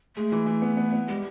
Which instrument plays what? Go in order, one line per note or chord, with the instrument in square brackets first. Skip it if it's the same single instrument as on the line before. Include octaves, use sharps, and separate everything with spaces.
[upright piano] G#3 [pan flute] A3
[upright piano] E3
E3
B3
B3
B3
[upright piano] G3 [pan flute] G#3